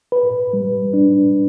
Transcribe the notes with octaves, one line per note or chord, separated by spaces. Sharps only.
B4
G3
D4